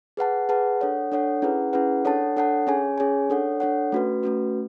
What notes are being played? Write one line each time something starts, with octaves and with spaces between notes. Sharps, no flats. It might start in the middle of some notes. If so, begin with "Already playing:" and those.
G#4 B4 F#5 A5
G#4 B4 F#5 A5
D4 A4 C#5 F#5
D4 A4 C#5 F#5
C#4 E4 G#4 B4 F#5
C#4 E4 G#4 B4 F#5
D4 A4 C#5 F#5 A5
D4 A4 C#5 F#5 A5
C#4 G#4 C#5 G#5
C#4 G#4 C#5 G#5
D4 A4 C#5 F#5
D4 A4 C#5 F#5
A3 C#4 F#4 B4
A3 C#4 F#4 B4